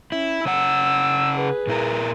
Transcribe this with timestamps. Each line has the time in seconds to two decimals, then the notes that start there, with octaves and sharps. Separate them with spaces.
0.12 C#4 E4
0.45 C#3 C#5 F#5 E6
1.35 G#4 B4
1.67 A#2 E4 A#4